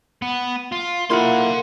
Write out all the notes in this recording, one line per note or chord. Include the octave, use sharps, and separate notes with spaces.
B3
F4
A#3 E4 F4 F#5 B5 C6